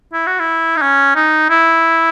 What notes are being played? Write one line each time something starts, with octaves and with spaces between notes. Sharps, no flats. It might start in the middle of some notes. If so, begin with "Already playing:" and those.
E4
F#4
E4
D#4
C#4
D#4
E4